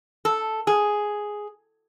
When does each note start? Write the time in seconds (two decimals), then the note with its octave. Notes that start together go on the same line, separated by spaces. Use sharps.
0.25 A4
0.67 G#4